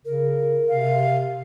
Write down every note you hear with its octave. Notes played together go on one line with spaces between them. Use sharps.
C#3 A#4
C3 F5